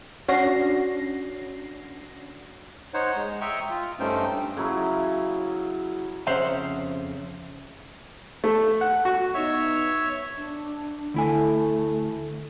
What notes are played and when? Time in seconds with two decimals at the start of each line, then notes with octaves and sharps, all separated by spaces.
0.28 C#4 D4 F#4 A#6 C7
2.94 D#4 C5 C#5 F#5
3.16 G#3
3.41 D#5 E5 G5 A#5 C#6
3.70 F4
4.00 G2 A3 C#4 D#4 C5 G5
4.57 C#3 F#3 E4
6.27 F2 C#3 C5 E5 F#5 A#5
8.44 A3
8.81 F#5
9.05 F#4
9.34 B3 D#4 C#5 E5
10.38 D4
11.14 D2 A3 E4 G#5